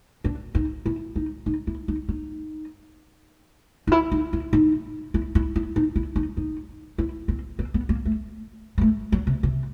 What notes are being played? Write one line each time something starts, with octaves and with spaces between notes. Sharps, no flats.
D4
D#4
E4
D#4
D#4
E4
D#4
D#4
D#4
E4
D#4
E4
D#4
E4
E4
E4
D#4
E4
D#4
D#4
E4
C4
C4
B3
A#3
A3
G#3
A3
F#3
C3
C3